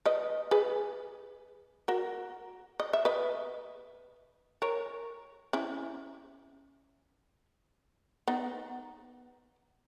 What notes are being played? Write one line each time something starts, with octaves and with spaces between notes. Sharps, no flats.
B4 D#5
G#4 B4
F#4 A#4
D#5
E5
B4 D#5
A#4 C#5
C#4 E4
B3 D#4